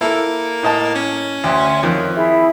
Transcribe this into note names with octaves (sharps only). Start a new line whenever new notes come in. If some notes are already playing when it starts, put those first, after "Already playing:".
A#3 E4 A4
A2 D#5 A5
C#4
D2 E5 G5 C6
F2 D#3 C#5
E4 G#4 E5